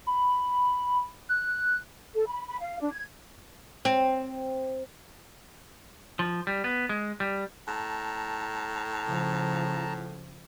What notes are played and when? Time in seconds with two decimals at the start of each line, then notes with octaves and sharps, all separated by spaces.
0.07 B5
1.29 F#6
2.14 A4
2.27 B5
2.47 B5
2.60 F5
2.80 D4
2.92 G#6
3.85 C4
6.19 F3
6.47 G3
6.64 B3
6.89 G#3
7.20 G3
7.68 A2 A5 A#5
9.06 C#3 F3